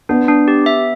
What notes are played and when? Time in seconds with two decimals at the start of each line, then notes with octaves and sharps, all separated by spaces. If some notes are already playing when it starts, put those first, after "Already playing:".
0.09 B3 D4
0.28 D4
0.48 G4
0.66 E5